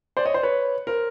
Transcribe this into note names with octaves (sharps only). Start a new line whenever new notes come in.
C5 D5
C#5 D#5
C5 D5
B4 C#5
A#4 C5